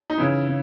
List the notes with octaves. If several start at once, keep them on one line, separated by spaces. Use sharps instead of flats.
D#4
C#3 E3 E4
C#3